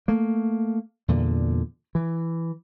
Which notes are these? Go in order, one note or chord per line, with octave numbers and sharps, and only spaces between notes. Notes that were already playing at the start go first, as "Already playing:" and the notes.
A3 A#3
E2 G2 A#2 D3
E3